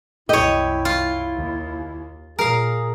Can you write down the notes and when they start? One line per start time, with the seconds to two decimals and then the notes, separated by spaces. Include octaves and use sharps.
0.29 C2 F#2 E4 G4 C#5 D#5
0.85 F4
1.36 D#2
2.39 A#2 G#4 A#4 F5